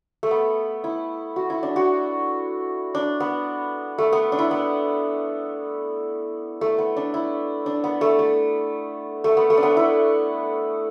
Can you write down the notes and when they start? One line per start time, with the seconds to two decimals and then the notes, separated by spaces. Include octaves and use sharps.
0.23 A3
0.31 B3
0.84 E4
1.36 F#4
1.50 E4
1.63 D4
1.76 F#4
2.95 D4
3.20 B3
3.98 A3
4.13 B3
4.32 D4
4.39 E4
4.51 B3
6.61 A3
6.78 B3
6.97 D4
7.14 E4
7.66 D4
7.84 B3
8.01 A3
8.19 A3
9.24 A3
9.37 B3
9.50 A3
9.58 D4
9.63 B3
9.77 E4